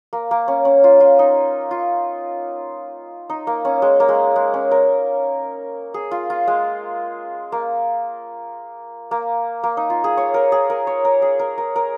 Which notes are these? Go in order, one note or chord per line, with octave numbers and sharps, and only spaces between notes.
A#3
A#3
C#4
C#4
F4
F4
D#4
F4
D#4
A#3
C#4
G#3
A#3
G#3
G#3
C#4
A#4
G#4
F4
F4
G#3
A#3
A#3
A#3
D#4
F4
G#4
C#5
A#4
G#4
A#4
C#5
A#4
G#4
A#4
A#4
A#4